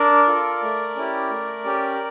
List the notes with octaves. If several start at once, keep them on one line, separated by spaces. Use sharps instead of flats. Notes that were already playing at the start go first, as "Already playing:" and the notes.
Already playing: D4 A#4 D5
F4 A4
A3
C#4 E4 G4
A3
C#4 G4